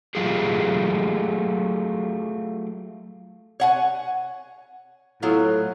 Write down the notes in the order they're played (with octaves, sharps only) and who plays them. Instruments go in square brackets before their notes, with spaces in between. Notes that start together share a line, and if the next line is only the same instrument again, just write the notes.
[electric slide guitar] F#3 A3 F4 G4 G#4
[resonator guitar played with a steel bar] C#5 F#5 G#5
[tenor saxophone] A2 [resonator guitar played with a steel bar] F#3 B3 F4